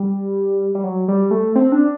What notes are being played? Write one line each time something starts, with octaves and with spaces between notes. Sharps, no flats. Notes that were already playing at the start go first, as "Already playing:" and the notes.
Already playing: G3
G3
F#3
G3
A3
C4
D4